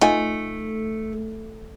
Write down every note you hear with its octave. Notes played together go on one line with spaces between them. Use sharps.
A3 D#4 F4 G#5